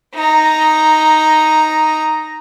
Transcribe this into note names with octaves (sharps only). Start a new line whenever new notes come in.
D#4 A#5